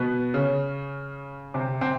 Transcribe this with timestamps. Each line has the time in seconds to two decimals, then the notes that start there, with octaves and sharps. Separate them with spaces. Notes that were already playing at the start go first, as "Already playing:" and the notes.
Already playing: B2 B3
0.33 C#3 C#4
1.54 C3 C4
1.81 C3 C4